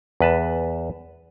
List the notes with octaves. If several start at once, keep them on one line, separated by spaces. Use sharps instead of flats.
E2 B4 A5